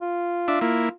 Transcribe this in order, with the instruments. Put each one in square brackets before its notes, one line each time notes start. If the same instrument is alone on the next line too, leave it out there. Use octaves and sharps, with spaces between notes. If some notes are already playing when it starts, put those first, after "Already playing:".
[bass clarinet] F4
[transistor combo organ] D4 E5
A#3 E4